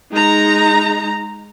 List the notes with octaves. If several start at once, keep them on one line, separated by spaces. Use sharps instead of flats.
G#3 D#4 A#5